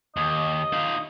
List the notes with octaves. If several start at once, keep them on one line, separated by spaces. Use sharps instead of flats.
D#2 D#5
D#4 F4